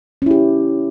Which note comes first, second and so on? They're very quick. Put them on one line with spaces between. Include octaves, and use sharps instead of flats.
C#4 E4 G4